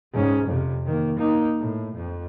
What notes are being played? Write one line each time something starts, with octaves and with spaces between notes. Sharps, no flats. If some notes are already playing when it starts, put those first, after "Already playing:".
G#2 C#4
F2 C3
D#3 A#3
A#3 D#4
A2
F2